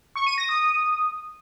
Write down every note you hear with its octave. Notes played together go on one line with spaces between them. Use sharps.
C#6
D#7
A#6
D#6